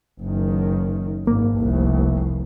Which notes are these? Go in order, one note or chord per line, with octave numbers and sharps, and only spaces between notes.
F#1 D#3
G#1 A#3
F1 C2